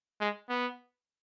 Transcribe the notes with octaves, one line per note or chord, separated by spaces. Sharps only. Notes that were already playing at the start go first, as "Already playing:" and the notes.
G#3
B3